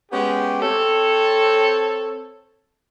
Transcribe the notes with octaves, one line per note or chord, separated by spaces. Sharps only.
G#3 B3 C#4 G4
C4 A4 C#5